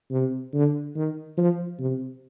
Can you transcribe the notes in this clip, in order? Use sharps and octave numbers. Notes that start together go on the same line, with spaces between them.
C3
D3
D#3
F3
C3